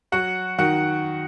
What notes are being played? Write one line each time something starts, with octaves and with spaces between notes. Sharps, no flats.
F#3 F#4 F#5
D#3 F#4 F#5